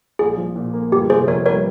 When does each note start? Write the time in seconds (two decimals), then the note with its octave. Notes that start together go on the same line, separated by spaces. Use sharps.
0.19 A#1 G#4
0.38 F3
0.56 A#2
0.73 A#3
0.92 G1 G4
1.10 C3 G#4 C5
1.27 F2 A#4 C#5
1.46 G3 A#4 C#5